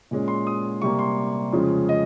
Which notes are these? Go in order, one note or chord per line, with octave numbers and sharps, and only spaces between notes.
A#2 G#3 C#4
C6
D#6
C3 G3 A#3 C#6
C6
F2 C#3 F3 G#3 C#4
D#5